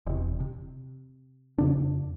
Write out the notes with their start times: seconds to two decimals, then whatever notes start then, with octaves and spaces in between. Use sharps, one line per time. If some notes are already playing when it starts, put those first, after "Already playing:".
0.07 E1 C3
0.40 C3
1.58 F2 C#3 D4